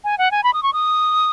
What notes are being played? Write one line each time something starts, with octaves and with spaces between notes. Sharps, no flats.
G#5
F#5
G#5
B5
D#6
C#6
D#6